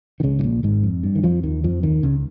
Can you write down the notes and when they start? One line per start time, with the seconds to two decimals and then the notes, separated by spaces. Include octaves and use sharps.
0.20 D#3
0.23 C#2 C#3
0.39 G#2
0.43 A#1 A#2
0.63 G#1 G#2
0.83 F2
1.03 G2
1.15 D#3
1.23 F2 F3
1.43 D#2 D#3
1.64 F2 F3
1.83 D#2 D#3
2.03 C#2 C#3